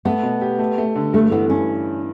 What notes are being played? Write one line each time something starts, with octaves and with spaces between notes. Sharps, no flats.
A3 B3
B2
G4
A3
A3
D3
G2 A3
E3 B3
G2 C#4